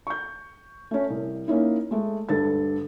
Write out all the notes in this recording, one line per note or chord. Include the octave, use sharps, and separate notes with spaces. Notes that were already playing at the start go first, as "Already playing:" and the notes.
C#6 G6
A3 C#4
C2
A#3 C#4 D#4 E4
G#3 A3
D2 G2 A4 A6